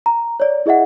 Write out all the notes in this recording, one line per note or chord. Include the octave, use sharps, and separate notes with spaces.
A#5
C#5 D5
E4 G#4 D#5 E5 F#5